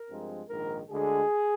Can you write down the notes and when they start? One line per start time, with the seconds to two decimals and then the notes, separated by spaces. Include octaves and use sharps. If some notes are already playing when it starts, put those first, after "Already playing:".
Already playing: A#4
0.10 G2 F3 G#3 C4
0.49 A#1 G#2 D#3 A#4
0.90 D2 D3 G#3 G#4